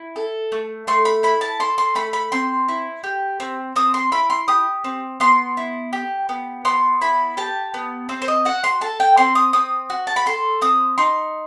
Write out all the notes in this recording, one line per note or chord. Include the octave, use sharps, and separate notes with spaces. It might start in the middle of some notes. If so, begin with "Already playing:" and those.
Already playing: E4
A4
A3
A3 C6
B5
E4 B5
A5
A4 C6
C6
A3 B5
B5
C4 C6
E4
G4
C4
C4 D#6
C6
E4 B5
C6
G4 D#6
C4
B3 C6
E4
G4
B3
B3 C6
E4 B5
G4 A5
B3
C4 C5
C5
D#5
F#4 F#5
C6
A4 A5
G5
C4 C6
D#6
C4 D#6
F#4
A5
B5
A4 C6
C4 D#6
D#4 C6